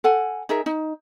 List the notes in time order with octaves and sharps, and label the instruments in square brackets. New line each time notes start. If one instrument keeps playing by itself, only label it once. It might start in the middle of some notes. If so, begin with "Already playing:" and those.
[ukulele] A4 F#5 G#5
D#4 G#4 A#4 E5
D#4